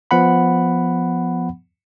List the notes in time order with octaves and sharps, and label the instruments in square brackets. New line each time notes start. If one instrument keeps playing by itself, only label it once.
[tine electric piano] F3 B3 F#5 B5